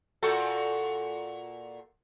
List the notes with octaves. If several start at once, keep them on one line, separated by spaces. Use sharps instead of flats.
A#2 F#4 A4